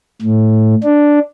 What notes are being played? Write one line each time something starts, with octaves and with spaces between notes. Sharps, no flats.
A2
D4